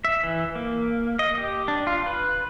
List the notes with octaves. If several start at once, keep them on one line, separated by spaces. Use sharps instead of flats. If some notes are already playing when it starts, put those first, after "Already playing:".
E5
E3
A#3
D#5
G4
D4
F4
B4